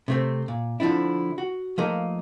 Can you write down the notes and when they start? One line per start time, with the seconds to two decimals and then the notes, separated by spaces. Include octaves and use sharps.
0.08 C3 A3 C4
0.48 A#2
0.80 D3 F3 C4 D4 E4
1.38 F#4
1.78 F3 A3 A#3 D#4 G#4 A#4